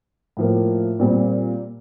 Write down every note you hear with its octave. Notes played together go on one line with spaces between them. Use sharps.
A2 F3 A#3
A#2 G3 C4